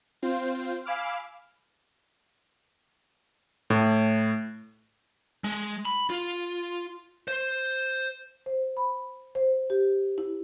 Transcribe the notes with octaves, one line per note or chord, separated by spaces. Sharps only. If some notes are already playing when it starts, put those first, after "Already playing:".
C4 F4 C5
F5 G#5 B5 D6 E6 F6
A2
G#3
B5
F4
C5
C5
B5
C5
G4
E4